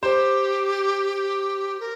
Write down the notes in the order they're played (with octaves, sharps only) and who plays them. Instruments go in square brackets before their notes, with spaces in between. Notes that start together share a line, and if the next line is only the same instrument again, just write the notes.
[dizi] G4 [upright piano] C5
[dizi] A#4